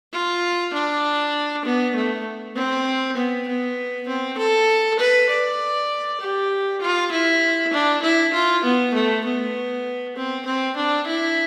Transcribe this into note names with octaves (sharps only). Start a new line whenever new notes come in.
F4
D4
B3
A3
C4
B3
B3
C4
A4
B4
D5
G4
F4
E4
D4
E4
F4
B3
A3
B3
C4
C4
D4
E4